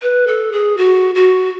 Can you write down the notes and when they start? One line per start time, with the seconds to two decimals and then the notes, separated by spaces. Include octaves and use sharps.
0.02 B4
0.27 A4
0.52 G#4
0.77 F#4
1.15 F#4